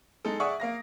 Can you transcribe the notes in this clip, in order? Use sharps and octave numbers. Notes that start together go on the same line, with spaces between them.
G#3 D#4 A4
G#4 D5 E5 F#5 C#6 D#6
A#3 F5 A#6